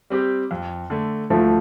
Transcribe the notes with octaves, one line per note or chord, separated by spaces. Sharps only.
G3 C4 G4
F2
D3 A3
D2 F3 A3